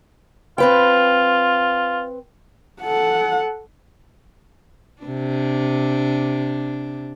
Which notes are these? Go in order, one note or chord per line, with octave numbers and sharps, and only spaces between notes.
C4 F4 B4 G5
A4 F#5
C3 D4